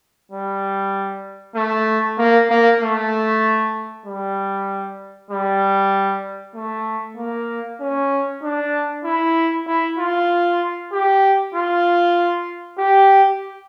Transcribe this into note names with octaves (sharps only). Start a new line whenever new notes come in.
G3
A3
A#3
A#3
A3
G3
G3
A3
A#3
C#4
D4
E4
E4
F4
G4
F4
G4